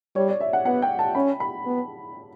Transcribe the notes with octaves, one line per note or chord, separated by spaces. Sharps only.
G3 C#5
D5
E5
F#5
B3 F#5
G5
A5
C#4 B5
B5
B3